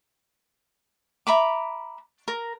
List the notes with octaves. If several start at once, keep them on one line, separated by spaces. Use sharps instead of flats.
E5 A#5 B5 D6
A#4